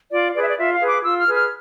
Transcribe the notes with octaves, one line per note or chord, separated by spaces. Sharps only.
F4 D5
G#4 B4 D5
E5
D5
F4 E5
F5
G#4 B4
D6
F4 E6
F6
G#4 B4
F6